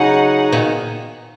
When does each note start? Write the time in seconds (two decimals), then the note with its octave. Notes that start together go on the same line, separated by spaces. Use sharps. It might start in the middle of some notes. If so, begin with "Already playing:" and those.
Already playing: C#3 F#3 D#4 G#4 F#5
0.52 A#2 D#3